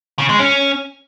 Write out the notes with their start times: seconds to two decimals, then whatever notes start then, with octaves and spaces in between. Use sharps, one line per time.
0.19 C#3
0.29 G#3
0.39 C#4